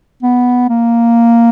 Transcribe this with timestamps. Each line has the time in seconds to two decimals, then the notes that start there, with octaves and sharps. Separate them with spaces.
0.23 B3
0.69 A#3